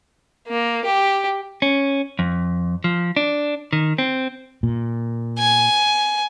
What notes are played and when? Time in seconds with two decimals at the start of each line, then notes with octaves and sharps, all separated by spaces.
0.48 A#3
0.85 G4
1.62 C#4
2.19 F2
2.84 F3
3.17 D4
3.73 D#3
3.98 C4
4.63 A#2
5.39 G#5